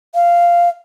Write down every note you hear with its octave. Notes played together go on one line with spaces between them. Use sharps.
F5